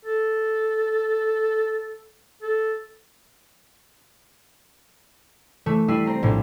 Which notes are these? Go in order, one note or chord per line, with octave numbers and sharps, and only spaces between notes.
A4
A4
E3 A3
G3 E4 B5 E6 C7 D#7
C4 A#5 C7
A#1 A2